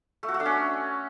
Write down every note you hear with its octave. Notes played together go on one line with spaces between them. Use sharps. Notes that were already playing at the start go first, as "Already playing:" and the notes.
A3
F#4
A3
D4
C#4